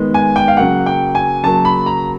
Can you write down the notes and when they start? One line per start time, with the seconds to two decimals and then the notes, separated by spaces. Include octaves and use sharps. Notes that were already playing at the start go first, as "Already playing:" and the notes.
Already playing: D#3 G#3 B3
0.14 G#5
0.36 G5
0.48 F5
0.57 C#3 F#3 A#3 F#5
0.86 G5
1.15 G#5
1.43 C#3 F#3 A#3 A5
1.65 B5
1.86 A#5